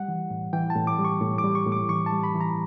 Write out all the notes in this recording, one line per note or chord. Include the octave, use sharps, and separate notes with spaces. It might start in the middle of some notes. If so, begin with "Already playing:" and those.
Already playing: G3 F#5
E3
A2
E3 G5
A5
A2
D6
G3
C#6
A2
D6
G3
C#6
A2
D6
E3 C#6
A5
G3
B5
E3
A#5